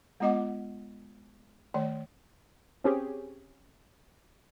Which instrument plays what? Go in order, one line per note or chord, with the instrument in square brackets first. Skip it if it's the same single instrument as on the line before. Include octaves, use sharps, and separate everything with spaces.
[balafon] G#3 B3 F4 D#5 F#5 D6
D#3 A3 C#5 D5
[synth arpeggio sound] C4 C#4 G4 G#4